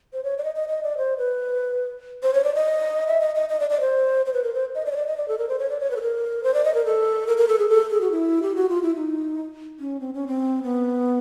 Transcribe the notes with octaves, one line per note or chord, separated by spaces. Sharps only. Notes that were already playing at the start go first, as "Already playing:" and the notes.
C5
C#5
D5
D#5
D#5
D#5
D5
C5
B4
C5
C#5
D5
D#5
E5
D#5
D#5
D#5
D5
D5
C5
C5
B4
A#4
C5
D#5
D5
C#5
D5
D#5
D5
A4
A#4
C5
C#5
D5
C#5
B4
A4
A#4
C5
D5
D#5
A#4
A4
A#4
A#4
A4
G#4
A4
G#4
F#4
E4
G4
F#4
F4
E4
D#4
C#4
C4
C#4
C4
B3